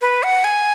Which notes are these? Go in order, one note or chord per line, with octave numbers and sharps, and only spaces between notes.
B4
F#5
G#5